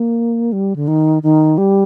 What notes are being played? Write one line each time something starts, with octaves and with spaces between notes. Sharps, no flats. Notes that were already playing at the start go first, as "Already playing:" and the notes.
Already playing: A#3
G3
D3
D#3
D#3
G3